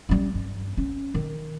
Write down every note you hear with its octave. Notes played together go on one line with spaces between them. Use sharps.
G3 C#4
G2
C#4
D#3